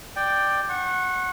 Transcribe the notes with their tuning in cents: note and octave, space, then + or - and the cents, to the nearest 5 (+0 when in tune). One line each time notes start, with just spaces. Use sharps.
D5 +10 G5 +0
F#5 +0 C#6 -35